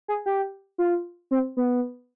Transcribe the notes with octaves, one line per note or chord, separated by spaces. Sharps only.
G#4
G4
F4
C4
B3